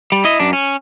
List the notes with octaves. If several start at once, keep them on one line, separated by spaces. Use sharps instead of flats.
G3
E4 D#5
F#2 D4
C#4